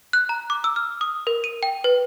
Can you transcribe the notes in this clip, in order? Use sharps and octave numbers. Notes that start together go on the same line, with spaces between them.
F#6
A#5
D6
E6
F6
D#6
A#4
D#7
G5
B4